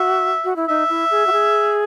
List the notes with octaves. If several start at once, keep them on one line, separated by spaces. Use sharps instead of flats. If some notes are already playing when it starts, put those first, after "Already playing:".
Already playing: F#4 E5
F#4
E4
D#4 E5
E4
G#4
F#4
G#4